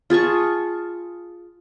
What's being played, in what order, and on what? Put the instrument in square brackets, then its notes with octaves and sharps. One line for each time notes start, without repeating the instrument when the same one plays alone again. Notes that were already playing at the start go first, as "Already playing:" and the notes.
[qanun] F4 G#4 A5 C#6